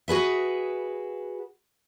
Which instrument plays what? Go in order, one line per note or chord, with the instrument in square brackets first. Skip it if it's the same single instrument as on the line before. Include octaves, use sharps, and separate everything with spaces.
[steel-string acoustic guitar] F#4 G#4 B4 E5